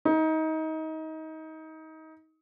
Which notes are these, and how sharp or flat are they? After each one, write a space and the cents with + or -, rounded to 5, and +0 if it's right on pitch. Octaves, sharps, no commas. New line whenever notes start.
D#4 +25